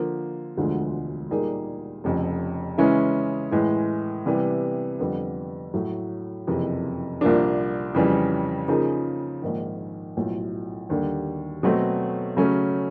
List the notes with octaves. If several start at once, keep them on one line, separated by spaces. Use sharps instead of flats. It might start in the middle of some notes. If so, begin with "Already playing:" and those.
Already playing: D3 F3 A#3
E1 D2 D3 F3 G#3
A#2 G3 A#3 D#4 G#4
F1 F2 C#3
C#3 E3 G#3 C#4 E4
A2 E3 G#3
C3 E3 G3 B3
F2 D3 G3 B3
A2 F#3 A3
F#1 F2 C3 E3
C2 A#2 F3 A#3 D4
F2 C#3 E3 G3
C#3 F3 A#3 D#4 G#4
A#1 G#2 D#3
B1 A2 F3
D#2 D3 G3
B2 F#3 A3 C4
C#3 F#3 A3 C#4